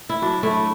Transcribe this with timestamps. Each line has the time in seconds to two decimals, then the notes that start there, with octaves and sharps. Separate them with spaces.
0.09 E4
0.22 F#3 D4
0.43 A3 E4